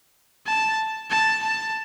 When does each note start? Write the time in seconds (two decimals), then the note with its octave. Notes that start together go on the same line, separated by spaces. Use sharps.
0.47 A5
1.11 A5
1.43 A5